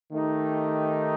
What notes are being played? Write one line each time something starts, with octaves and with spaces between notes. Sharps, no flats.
D#3 A3 D#4 G4